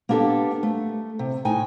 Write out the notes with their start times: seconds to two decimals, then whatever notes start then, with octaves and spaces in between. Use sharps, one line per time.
0.09 A#3 B3 D4 G4 A4
0.63 A3
1.19 C3
1.45 A2 D#4 G5 G#5